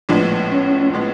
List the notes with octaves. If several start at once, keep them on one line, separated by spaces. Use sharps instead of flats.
A#1 A2 F3 G#3 B3 D4
C#4
A2 F3 G#3 B3